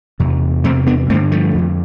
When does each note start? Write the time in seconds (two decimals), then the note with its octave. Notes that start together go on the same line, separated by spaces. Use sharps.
0.20 E2 C3
0.64 E2 C3 A3 C4
0.87 B3 D4
1.10 G2 A3 C4
1.14 D3
1.32 F3 A3
1.55 F2 D3